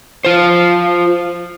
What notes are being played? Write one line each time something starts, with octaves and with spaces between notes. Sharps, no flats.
F4 C5